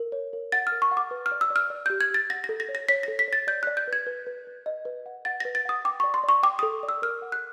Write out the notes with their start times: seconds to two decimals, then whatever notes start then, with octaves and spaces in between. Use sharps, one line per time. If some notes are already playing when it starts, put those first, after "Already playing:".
Already playing: A#4
0.12 C#5
0.33 A#4
0.52 F#5 A6
0.67 F6
0.72 A#4
0.82 C#6
0.91 F#5
0.97 D6
1.11 B4
1.26 F6
1.32 D5
1.41 E6
1.51 D5
1.56 F6
1.70 D5
1.86 G4 G6
2.01 G#6
2.11 G4 A6
2.30 F#5 A#6
2.44 A#6
2.49 A4
2.60 A#6
2.69 C#5
2.75 A#6
2.89 C#5 B6
3.03 A4 A#6
3.19 B6
3.28 C#5 A6
3.47 D5 G6
3.63 D5 F#6
3.77 G6
3.88 B4
3.93 G#6
4.07 B4
4.27 B4
4.47 B4
4.66 D#5
4.85 B4
5.06 F#5
5.25 F#5 A6
5.40 B4 A#6
5.55 A6
5.65 F#5 D#6
5.85 G5 D6
6.00 D5 C#6
6.14 C6
6.23 D5
6.29 C#6
6.43 G5 D6
6.59 A4 D#6
6.83 D5
6.89 E6
7.02 A#4 F6
7.22 F#5
7.32 F#6